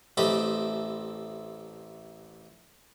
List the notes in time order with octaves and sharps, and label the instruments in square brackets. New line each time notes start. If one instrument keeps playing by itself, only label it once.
[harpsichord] A1 A3 C4 G4 D#5 B5